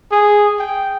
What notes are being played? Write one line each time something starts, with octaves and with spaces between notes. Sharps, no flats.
G#4
G5